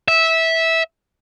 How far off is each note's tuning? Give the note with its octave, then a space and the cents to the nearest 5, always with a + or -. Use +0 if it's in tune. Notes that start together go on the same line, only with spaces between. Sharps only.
E5 -15